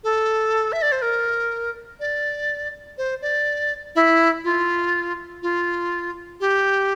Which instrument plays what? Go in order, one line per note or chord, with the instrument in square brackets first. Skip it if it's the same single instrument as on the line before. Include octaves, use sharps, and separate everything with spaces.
[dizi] A4
E5
D5
C5
A#4
D5
C5
D5
E4
F4
F4
G4